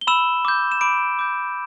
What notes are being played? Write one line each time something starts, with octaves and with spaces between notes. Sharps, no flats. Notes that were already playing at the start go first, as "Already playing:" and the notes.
G7
B5 E6 E7
D6 G6
E7
B5 D6 D7
D6 G6